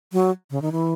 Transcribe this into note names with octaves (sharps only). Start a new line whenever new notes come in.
F#3
C#3
D#3
E3